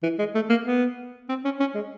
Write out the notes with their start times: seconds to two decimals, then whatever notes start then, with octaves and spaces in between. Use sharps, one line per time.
0.03 E3
0.19 G#3
0.35 A3
0.50 A#3
0.66 B3
1.29 C4
1.45 C#4
1.60 C#4
1.75 G#3